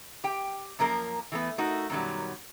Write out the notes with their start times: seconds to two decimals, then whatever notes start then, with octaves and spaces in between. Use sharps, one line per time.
0.24 G4 G5
0.79 F#2 F3 A#3 A#4
1.32 E3 A3 B3
1.58 A3 D#4 F#4 A#4
1.90 F#2 B2 D#3 F#3 G3